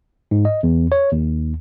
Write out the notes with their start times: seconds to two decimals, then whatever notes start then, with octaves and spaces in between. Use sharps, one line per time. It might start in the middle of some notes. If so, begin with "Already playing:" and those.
0.31 G#2
0.45 D#5
0.63 E2
0.92 C#5
1.12 D#2